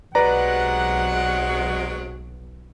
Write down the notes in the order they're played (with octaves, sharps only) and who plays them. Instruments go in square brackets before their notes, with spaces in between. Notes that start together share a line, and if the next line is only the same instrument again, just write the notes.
[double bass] B1 [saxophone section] C3 F#3 G#3 [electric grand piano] B4 D5 A#5 [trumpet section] F#5